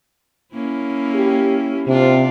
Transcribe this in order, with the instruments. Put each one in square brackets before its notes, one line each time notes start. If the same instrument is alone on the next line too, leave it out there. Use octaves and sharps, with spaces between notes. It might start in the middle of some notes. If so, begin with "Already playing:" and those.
[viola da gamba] A#3 C#4 E4
[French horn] G4
[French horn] C3 [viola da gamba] D4 F4